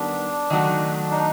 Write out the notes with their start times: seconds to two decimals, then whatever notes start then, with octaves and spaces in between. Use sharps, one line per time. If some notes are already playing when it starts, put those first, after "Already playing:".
Already playing: D#3 G3 B3 D4
0.50 D#3 F#3 A3
1.11 D#4